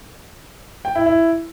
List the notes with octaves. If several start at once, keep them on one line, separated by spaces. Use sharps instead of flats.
G5
E4
E4